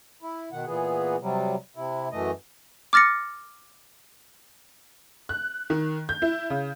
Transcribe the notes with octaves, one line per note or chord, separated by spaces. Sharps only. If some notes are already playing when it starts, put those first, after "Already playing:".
E4
B2 D#3 F#5
A#2 E3 B3 G#4
C3 F#3 G3
C3 E4
F#2 E3 A3 D#5
D6 F6 A6 A#6 C#7
F#6
D#3
G6
E4
C#3